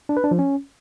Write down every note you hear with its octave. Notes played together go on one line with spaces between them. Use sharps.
D4
B4
D4
F3
C#4